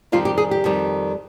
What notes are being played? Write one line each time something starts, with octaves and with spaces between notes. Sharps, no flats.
F2 D#3 G3 F4
G4
G#4
G4
F2 D#3 G3